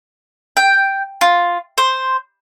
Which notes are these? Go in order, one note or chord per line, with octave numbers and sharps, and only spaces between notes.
G5
F4
C5